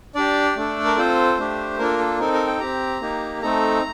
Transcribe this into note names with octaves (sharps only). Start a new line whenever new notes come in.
D4 G4 D5
A3 D4 A4
A#4
C4 F4 A4 C5
A3 D4 G4
A#3 D4 F4 A4 A#4
A4
C4 D#4 A4 A#4
A#4
G5
C4 G4 A#5
A#3 D#4 G4
A3 C4 D#4 A4 A#5